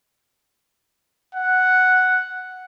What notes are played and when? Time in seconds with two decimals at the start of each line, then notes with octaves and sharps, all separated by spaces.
1.35 F#5